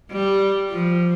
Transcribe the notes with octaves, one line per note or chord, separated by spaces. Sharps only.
G3
F3